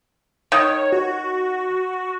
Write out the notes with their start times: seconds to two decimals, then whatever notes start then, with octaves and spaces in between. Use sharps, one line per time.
0.52 D#3 C#5
0.92 F#4